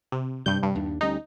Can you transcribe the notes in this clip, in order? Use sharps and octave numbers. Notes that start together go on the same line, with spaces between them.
C3
G2 C3 G3 G6
G2
D#2 D4
D2 G3 C#4 D#4